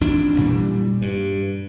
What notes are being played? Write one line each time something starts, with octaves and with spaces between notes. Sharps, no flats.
A1 F2 A2 D4
A#2 E3 G3
G2